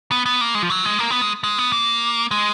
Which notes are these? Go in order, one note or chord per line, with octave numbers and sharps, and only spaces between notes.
B3
B3
A#3
G#3
F3
F#3
G#3
A#3
B3
G#3
G#3
B3
A#3
G#3